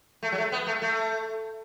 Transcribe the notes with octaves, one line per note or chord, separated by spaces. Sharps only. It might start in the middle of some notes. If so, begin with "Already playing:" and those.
A3
F#3
A3
B3
A3
A3